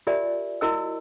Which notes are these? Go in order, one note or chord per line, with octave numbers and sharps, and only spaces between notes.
F4 G4 A#4 D5 E5 G#5
E4 F#4 A#4 D#5 G#5 E6